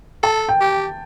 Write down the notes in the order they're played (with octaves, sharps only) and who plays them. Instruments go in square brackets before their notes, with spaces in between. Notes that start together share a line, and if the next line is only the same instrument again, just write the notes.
[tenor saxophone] A4 [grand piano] A5
[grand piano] G5
[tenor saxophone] G4